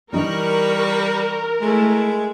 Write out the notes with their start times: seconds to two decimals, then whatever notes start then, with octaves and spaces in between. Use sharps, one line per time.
0.13 E3 G3 D#4 A#4 C#6 F#6
1.61 G#3 A3 E4